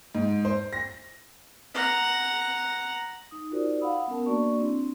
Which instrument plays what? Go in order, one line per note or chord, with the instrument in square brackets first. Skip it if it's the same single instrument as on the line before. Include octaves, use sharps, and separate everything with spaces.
[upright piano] G#2
C5
A#6
[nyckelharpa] F#5 A#5
[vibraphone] D#4 D#6
D#4 F4 F#4 A#4 C5 D5
F5 F#5 B5 D#6 E6
B3 C#4 A#4 A5
A#3 D4 F#4 D5 C#6
C4 D4 E4